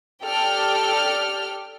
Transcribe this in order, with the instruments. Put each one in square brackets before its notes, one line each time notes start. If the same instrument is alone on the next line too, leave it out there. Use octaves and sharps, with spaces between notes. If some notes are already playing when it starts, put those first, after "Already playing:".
[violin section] G4 A4 D5 G5 F6